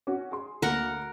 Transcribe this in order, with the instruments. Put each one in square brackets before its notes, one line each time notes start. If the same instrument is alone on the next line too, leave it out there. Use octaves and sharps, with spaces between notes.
[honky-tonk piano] C#4 F#4
G#4 C6
[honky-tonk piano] D2 A#3 [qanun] A#4 F#5